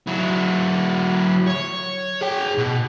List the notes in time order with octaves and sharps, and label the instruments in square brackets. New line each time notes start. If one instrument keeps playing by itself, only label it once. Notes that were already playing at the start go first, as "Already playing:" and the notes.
[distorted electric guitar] F#3 E4
C#5
G#4 G5
B2